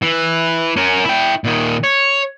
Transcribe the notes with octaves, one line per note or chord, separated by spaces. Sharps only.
E3
C#4 A#4
E4 G5
A#2 D#3
C#5